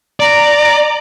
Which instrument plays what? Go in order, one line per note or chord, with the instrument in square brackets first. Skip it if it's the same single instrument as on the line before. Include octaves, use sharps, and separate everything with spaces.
[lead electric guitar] D5 [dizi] A#5